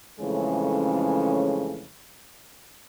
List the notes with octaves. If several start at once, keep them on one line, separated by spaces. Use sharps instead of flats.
F2 C#3 E3 G#3 A3 C#4